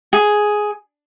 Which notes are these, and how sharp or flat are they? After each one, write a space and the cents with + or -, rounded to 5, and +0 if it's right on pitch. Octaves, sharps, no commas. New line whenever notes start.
G#4 +5